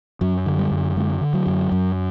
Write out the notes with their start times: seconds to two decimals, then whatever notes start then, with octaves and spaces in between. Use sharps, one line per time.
0.21 F#2 F#3
0.46 D3
0.58 G3
0.71 F#2
0.97 D3 G#3
1.21 D3
1.33 F#3
1.47 F#2
1.72 F#2